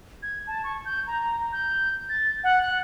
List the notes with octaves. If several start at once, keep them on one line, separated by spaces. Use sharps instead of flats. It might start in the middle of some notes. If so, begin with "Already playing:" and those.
G#6
A5
C#6
G6
A#5
G6
A6
F#5
F#6